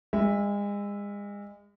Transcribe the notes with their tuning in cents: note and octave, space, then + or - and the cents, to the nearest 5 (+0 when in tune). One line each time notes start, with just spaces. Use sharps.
G#3 -35 E5 +0